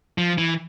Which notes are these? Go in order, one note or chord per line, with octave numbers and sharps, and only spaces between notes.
F3
E3